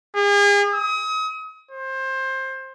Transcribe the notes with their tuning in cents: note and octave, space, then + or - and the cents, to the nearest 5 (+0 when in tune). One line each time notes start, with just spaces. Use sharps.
G#4 -40
D#6 +35
C5 +20